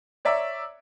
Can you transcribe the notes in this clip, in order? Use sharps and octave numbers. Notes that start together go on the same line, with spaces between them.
C#5 D5 E5 A#5 D6 E6